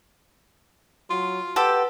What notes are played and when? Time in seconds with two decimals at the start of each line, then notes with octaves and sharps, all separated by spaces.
1.10 F#3 F4
1.56 G4 A4 B4 F#5 C6